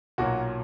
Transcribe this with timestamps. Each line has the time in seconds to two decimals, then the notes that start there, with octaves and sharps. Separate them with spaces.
0.18 B1 A#2 F#3 A#3 F#4